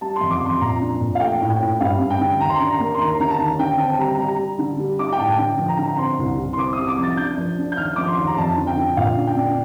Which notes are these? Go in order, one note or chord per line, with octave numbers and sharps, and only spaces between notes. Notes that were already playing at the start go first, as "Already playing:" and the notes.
G3 A5
C6
F2
D6
F2 C6
A#2 A#5
D4
A#2
F5
A3 G5
A2
G5
A2
G2 F5
G2
G5
D3
D#2 A#5
C6
D4 A#5
A#5
A#3
C6
D#2 A#5
D3 A#5
A5
D#2
D3 G5
C4 A5
G3 A#5
G3 A#5
G3
D3
G3
D#4 D6
G5
A2 A5
D3 G5
F3
A#5
D3
A#5
C4 C6
C2
C2
C6
C4 D6
D#6
C3
D6
F3 A6
D4 G6
F3
D4
G6
D#2 F6
F3 D6
C6
D#2
A#5
F2 A5
D3
G5
D3
A#2 F5
D4
G5
D4